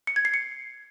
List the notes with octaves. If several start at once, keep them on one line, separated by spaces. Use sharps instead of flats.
C#7
G#6
C7
C#7